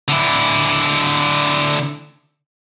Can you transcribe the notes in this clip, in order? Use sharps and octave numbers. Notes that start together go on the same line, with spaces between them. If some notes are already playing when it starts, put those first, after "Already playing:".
D3 E4